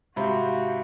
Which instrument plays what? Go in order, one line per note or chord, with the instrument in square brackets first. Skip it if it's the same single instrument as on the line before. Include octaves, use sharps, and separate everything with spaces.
[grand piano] G#2 C3 C5 [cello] F#4 [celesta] E5 B5 [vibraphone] F5